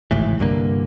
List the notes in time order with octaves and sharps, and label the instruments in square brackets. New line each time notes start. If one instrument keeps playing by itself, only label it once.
[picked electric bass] G#1 C#2 A2 E3
C2 G2 D3 A#3